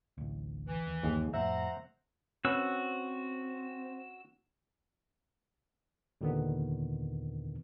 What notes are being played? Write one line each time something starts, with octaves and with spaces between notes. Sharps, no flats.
A1 D2
E3
D#2
G1 D#2 G#4
F2 A2 C5 E5 F#5 A#5
C4 C#4 F#4 B4 E6
D#2 A#2 D3 D#3 B3